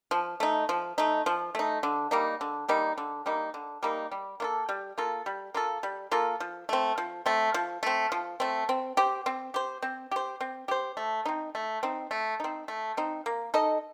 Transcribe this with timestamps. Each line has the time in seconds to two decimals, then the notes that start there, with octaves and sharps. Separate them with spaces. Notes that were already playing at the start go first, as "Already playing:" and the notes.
0.11 F3
0.40 A3 D#4
0.69 F3
0.98 A3 D#4
1.26 F3
1.55 A3 D#4
1.83 D3
2.11 G3 A#3 D#4
2.41 D3
2.69 G3 A#3 D#4
2.98 D3
3.26 G3 A#3 D#4
3.54 D3
3.83 G3 A#3 D#4
4.12 G3
4.40 A#3 F4 A4
4.69 G3
4.98 A#3 F4 A4
5.26 G3
5.54 A#3 F4 A4
5.83 G3
6.11 A#3 F4 A4
6.40 F3
6.69 A3 C4
6.98 F3
7.26 A3 C4
7.54 F3
7.83 A3 C4
8.12 F3
8.40 A3 C4
8.69 C4
8.97 G4 C5
9.26 C4
9.54 G4 C5
9.82 C4
10.11 G4 C5
10.41 C4
10.68 G4 C5
10.97 A3
11.25 C4 D#4
11.55 A3
11.83 C4 D#4
12.11 A3
12.40 C4 D#4
12.68 A3
12.97 C4 D#4
13.26 A#3
13.54 D#4 A4 D#5